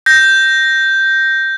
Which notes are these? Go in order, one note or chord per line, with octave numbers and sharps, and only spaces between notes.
G6 A#6